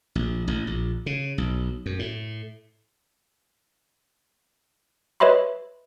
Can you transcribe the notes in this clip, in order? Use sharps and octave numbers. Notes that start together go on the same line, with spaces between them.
A#1
A1
A#1
C#3
B1
F#2
A2
B4 C#5 D#5 E5 B5 C6